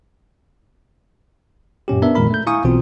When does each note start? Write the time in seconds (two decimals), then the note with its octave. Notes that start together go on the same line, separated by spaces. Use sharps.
1.88 F#2 A#2 C#4 G4
2.02 B3 D4 A#4 B4 E5
2.15 F2 A#2 D#3 G#3 A#4 B5
2.31 A3 G6
2.47 E4 F5 G#5 A#5 C#6 D#6
2.64 B1 B2 E3 C4 F4